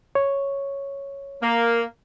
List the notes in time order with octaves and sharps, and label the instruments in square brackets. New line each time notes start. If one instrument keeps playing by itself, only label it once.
[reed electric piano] C#5
[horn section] A#3